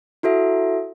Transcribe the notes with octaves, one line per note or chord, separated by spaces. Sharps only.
E4 F#4 A4 E5